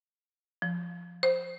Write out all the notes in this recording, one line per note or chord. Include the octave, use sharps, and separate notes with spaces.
F3
C5